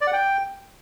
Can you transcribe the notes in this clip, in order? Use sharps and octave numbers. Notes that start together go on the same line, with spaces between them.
D5
F#5
G5